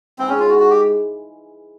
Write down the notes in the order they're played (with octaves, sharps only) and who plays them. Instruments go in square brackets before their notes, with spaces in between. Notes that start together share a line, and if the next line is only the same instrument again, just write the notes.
[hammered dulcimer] G#2 E3 G#3 [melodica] C4
[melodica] C#4
F4
F#4
F#4
G4